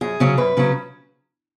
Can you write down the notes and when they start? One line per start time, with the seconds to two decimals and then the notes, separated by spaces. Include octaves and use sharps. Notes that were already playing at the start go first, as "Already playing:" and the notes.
0.01 F#2 G#4
0.20 C#3 F#3 C#4
0.37 F#2 B4
0.57 C#3 F#3 C#4